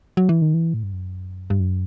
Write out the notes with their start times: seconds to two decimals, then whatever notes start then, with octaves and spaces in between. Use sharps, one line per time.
0.17 F#3
0.29 E3
0.42 D#3
0.54 E3
0.74 A2
0.83 G2
0.93 F#2
1.50 G2
1.60 F#2